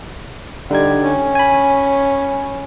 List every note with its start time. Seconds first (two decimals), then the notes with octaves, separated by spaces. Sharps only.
0.71 D3 G3 D#4 G#6
1.02 C#4
1.35 G#5 B5